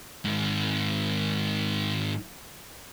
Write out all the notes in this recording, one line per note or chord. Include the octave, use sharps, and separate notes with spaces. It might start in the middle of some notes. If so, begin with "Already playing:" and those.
G#2 D#3